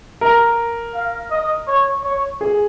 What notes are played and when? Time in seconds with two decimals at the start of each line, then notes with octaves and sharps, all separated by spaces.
0.21 A#4
0.94 F5
1.31 D#5
1.67 C#5
2.04 C#5
2.41 G#4